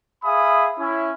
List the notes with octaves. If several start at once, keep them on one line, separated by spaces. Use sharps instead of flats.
G#4 E5 F5 G#5 B5 D#6
C#4 E4